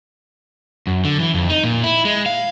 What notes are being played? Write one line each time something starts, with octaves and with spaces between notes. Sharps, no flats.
F#2
D3
E3
F2
D#4
A#2
E4
G#3
F5